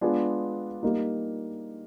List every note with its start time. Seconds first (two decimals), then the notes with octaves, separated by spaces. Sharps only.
0.01 G#3 B3 D4 F4 G#4
0.83 G3 A#3 D#4